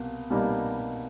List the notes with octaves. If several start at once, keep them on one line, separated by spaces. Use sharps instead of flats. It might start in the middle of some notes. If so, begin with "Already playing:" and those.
Already playing: C2 B2 A#3
C2 B2 G3 A#3 D#4